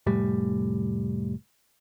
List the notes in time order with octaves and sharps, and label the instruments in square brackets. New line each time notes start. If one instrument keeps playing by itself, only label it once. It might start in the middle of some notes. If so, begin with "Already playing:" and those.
[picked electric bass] F1 A2 G3